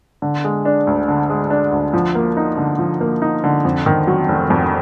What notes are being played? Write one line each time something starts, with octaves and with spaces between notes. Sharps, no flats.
D3
G#3
D4
D2
D3
G#3
D4
D2
F3
A#3
D#4
D3
F3
A#3
D#4
D3
F2
D#3
F#3
F1
F2